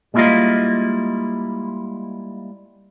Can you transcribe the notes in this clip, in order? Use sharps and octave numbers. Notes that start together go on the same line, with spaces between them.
G3 G#3 A#3 E4 F4 D#5